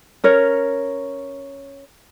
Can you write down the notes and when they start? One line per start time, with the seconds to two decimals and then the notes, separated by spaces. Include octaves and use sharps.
0.24 C#4 A#4 C#5